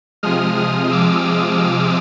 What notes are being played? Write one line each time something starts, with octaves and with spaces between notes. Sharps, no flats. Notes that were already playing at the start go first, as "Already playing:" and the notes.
C3 F3 G#3 D#6 F6
D#6 F6
D6 E6